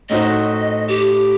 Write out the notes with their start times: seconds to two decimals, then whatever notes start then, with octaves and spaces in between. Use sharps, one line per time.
0.10 A2 A3 D#4 F#4 C5 D#5
0.88 G4